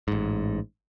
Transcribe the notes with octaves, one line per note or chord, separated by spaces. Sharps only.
A1 G#2